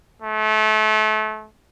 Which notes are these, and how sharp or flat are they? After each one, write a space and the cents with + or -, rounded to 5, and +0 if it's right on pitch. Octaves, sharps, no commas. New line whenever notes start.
A3 -30